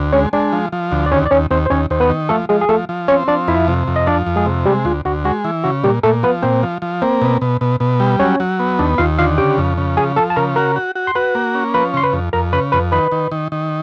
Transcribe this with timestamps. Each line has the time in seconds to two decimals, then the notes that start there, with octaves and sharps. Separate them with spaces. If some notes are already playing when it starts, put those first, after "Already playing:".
Already playing: D2
0.13 G#3 C#4 C#5
0.33 G#3 D4 D5
0.52 F3
0.72 F3
0.92 D2
1.06 D5
1.12 D#2 C#4 C#5
1.26 D5
1.31 D#2 C#4 C#5
1.51 D#2 C4 C5
1.66 C5
1.70 D#2 C#4 C#5
1.90 D#2 C5
2.00 B3 B4
2.10 D#3
2.29 F3 A3 A4
2.49 F3 G#3 G#4
2.61 G#4
2.69 F3 A3 A4
2.89 F3
3.08 C4 C#4 C#5
3.28 F3 D4 D5
3.48 F2 E4 E5
3.68 C3
3.88 F2
3.96 D#5
4.07 F3 D4 D5
4.26 F2
4.36 G#3 G#4
4.46 C3
4.65 G3 G#3 G4
4.85 D2 F4
5.05 D2 F#4
5.25 G#3 F#4
5.44 E3
5.64 C#3 F#4
5.83 A#2 G3 G4
6.03 A#2 A3 A4
6.23 F3 B3 B4
6.42 A#2 C4 C5
6.63 F3
6.82 F3
7.02 A#3 C4 C5
7.22 B2
7.41 B2
7.61 B2
7.80 B2
8.00 G3
8.20 F#3 C#4 C#5
8.40 F#3
8.59 B3
8.79 D#2 D4 D5
8.98 D#2 F4 F5
9.18 D3 F4 F5
9.38 C#3 G4 G5
9.58 F2
9.78 C#3
9.97 F3 G#4 G#5
10.16 F3 A4 A5
10.30 A5
10.36 C#3 A#4 A#5
10.56 F#4 A#4 A#5
10.76 F#4
10.95 F#4
11.07 C6
11.15 F#4 B4 B5
11.35 A#3
11.55 C#4
11.74 F3 B4 B5
11.94 C#3 C6
12.03 B4 B5
12.13 F2
12.33 F2 A#4 A#5
12.53 C#3 B4 B5
12.72 F2 B4 B5
12.92 D#3 B4 B5
13.12 D#3
13.32 D#3
13.52 D#3